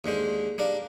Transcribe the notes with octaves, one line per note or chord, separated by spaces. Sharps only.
D#2 D3 G#3 C5
G3 D4 A#4 F5